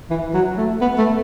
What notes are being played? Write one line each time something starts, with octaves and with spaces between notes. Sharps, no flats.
E3
F#3
A3
B3
A3